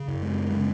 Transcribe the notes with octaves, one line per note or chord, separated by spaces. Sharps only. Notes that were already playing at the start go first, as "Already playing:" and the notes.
Already playing: C#3
F#2
G#3
C#3 G#3